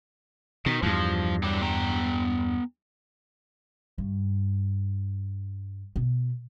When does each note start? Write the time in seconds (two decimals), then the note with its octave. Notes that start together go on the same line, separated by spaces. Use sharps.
0.66 B2 D#3
0.83 E2 G2 F3
1.43 F#3 G3 D4
1.61 B3 G5 A#5
3.98 G2
5.96 B2